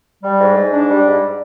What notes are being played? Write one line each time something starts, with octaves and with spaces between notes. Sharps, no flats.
G3
G#2
G#2
D4
G3
G#2